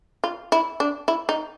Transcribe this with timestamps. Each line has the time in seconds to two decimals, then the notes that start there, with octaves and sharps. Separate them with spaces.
0.24 F4
0.52 E4
0.80 D4
1.08 E4
1.29 D#4